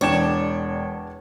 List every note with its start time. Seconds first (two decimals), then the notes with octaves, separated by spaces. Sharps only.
0.01 E1 E2 D4 C#5 D5 G5 E7